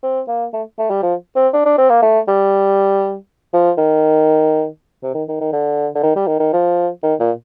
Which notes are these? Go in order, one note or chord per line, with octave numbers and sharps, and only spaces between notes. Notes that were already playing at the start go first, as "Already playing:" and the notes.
C4
A#3
A3
A3
G3
F3
C4
D4
D4
C4
A#3
A3
G3
F3
D#3
C3
D#3
D#3
D#3
D3
D3
D#3
G3
D#3
D#3
F3
D#3
A#2